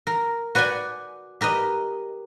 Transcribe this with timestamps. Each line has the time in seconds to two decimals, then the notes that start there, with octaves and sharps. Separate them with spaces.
0.07 A#4
0.55 F#4 B4 D5 G5 G#5
1.41 G4 A#4 B4 D#5